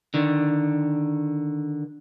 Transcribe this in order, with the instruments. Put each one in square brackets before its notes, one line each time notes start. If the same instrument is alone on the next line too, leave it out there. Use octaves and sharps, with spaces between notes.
[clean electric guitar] D3 D#3